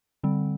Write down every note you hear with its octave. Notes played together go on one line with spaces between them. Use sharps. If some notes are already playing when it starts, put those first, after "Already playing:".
D3 G3 C4